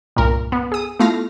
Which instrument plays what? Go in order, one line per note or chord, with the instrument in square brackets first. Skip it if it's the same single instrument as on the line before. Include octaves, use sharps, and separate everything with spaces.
[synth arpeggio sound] C2 G2 [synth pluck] A#2 A#4
[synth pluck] B3
G#4 D#6
[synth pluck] A3 F5 A#6 [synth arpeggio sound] B3 E4 F4